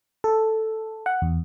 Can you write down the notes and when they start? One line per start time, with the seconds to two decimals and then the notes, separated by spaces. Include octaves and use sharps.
0.24 A4
1.06 F#5
1.22 E2